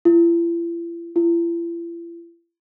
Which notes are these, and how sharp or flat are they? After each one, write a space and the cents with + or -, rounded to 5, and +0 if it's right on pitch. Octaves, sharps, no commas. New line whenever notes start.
E4 +45
E4 +45